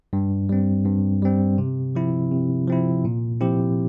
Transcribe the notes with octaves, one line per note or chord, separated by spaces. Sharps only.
G2
G3 C4
G2
G3 C4
C3
F3 C4 E4
C3
F3 C4 E4
A#2
F3 C4 E4 G4